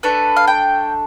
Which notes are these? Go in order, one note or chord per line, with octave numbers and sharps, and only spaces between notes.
A3 D4 A4 B4
F5
G5